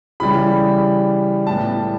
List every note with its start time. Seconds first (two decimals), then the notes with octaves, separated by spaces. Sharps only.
0.20 C#3 E3 G3 B5
1.47 A2 G3 B3 A5